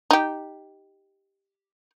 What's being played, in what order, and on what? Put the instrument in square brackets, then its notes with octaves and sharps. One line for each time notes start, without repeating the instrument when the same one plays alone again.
[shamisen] D#4 G4